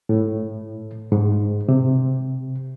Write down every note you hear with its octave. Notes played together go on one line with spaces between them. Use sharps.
A2
G#2
C3